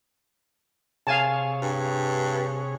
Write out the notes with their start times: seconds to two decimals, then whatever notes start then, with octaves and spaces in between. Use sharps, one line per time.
1.07 C3 G#4 C#5 F5 G#5 A5
1.62 G2